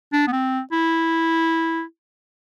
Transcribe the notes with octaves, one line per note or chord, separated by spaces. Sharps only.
D4
B3
C4
E4